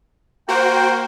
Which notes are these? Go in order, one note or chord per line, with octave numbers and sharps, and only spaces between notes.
A#3 F#4 C5 G5